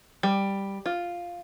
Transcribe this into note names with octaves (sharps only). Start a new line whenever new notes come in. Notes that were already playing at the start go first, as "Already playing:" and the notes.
G3
F4